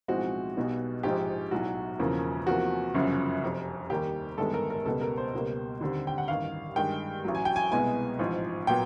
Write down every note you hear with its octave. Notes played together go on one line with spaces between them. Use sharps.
B1 A2 F3 G#3 C4 F#4
B1 B2 G3 B3
A#1 G#2 F3 G#3 G4
B1 A2 F#3 F#4
E1 E2 C#3 F3 A#3
E2 C3 F3 A#3 F#4
G1 F#2 C#3 F3
F1 F2 C3
D#2 D#3 G3 A#3 G4
G1 G2 D#3 G#3 B3 A4
A#4
A#4
C#2 B2 G3 B3 A4
A#4
C5
C#2 B2 G3 A#3
D#2 D3 G3 C4
G5
F#5
A1 G2 D#3 F5
G2 D#3 G#3 G5
A1 A2 F#3
G#5
G5
G#5
C2 B2 G#3 B3 G#5
A1 G#2 F3
A#2 F#3 B3 G5